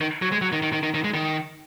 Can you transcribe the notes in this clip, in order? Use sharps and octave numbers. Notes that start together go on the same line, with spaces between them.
D#3
F#3
G#3
F#3
D#3
D#3
D#3
D#3
D#3
G#3
D#3